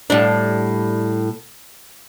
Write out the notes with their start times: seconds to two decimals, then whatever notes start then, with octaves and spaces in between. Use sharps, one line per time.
0.10 A2 G3 D4